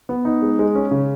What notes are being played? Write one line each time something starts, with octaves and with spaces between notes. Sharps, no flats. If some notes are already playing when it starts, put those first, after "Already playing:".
B3
D#4
G#3
G#3
C#4
C#3